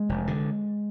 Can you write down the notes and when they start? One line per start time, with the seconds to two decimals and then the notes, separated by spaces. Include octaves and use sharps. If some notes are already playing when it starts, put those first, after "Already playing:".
Already playing: G#3
0.09 F1
0.27 D3